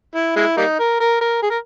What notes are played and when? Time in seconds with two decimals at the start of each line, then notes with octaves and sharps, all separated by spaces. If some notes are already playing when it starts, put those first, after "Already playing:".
0.15 E4
0.36 G#3 E4
0.57 G3 A#3 D#4
0.79 A#4
1.00 A#4
1.21 A#4
1.42 G#4
1.50 A#4